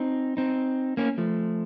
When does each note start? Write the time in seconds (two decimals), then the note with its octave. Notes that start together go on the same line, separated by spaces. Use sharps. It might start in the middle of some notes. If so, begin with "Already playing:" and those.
Already playing: C4 D#4
0.37 C4 D#4
0.97 A#3 C#4
1.18 F3 A3